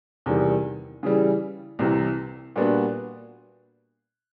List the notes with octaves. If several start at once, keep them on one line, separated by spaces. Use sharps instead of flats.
E2 C3 D#3 G3
C#3 E3 G3
C2 C3 E3
A#2 G3 B3 D4 F#4